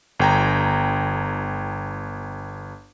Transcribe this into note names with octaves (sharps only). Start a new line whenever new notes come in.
G1 G5 A#5